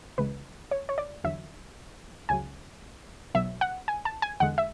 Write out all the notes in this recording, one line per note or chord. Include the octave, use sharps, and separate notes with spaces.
C#2 C#3 E3 G#3 B4
C#5
C#5
D5
E2 D3 F#3 E5
C#2 C#3 F#3 G#5
B1 B2 F#3 E5
F#5
G#5
A5
G#5
E2 D3 G#3 F#5
E5